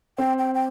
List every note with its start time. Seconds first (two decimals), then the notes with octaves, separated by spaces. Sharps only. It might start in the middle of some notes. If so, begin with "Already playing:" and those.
0.18 C4 G5
0.39 G5
0.54 G5